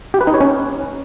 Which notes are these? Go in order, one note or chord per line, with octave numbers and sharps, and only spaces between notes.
G4
B4
D#4
C#5
C#4